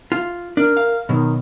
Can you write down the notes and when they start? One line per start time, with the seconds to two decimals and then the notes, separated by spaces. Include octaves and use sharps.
0.12 F4
0.57 D4 A#4
0.77 F5
1.09 B2 D#3 F#3